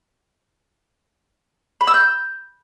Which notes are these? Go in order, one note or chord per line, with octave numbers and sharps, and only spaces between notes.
B5
E6
G6